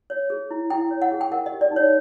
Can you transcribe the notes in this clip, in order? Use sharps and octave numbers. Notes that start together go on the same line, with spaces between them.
C#5
G#4
E4
E4 G5
C#5
F#5
G#4
G5
A#4 F#5
D#5
G4
D5
D#4
C#5